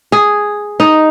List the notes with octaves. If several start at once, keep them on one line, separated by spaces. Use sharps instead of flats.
G#4
D#4